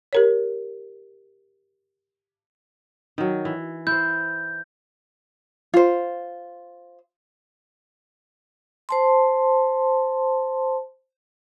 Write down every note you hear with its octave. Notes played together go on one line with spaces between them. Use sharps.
G4 A#4 C#5
D#3 F#3
E3
E4 C5 G6
F4 C5
C5 A5 C6